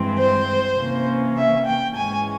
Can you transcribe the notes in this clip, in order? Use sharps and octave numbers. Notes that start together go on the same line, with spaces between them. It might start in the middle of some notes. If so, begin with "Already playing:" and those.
Already playing: G2 E3 G#3 C4
C5
C3 E3 A#3 C#4
E5
G5
G#2 E3 G#3 C#4 G#5